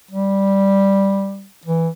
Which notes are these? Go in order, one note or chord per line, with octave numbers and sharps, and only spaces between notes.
G3
E3